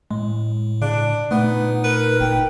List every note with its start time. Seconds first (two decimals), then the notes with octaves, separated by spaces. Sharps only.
0.11 A2 G#3
0.82 C#3 D4
1.31 A#2 A3 B3 D#4
1.84 A#4 B4
2.20 F#1 G5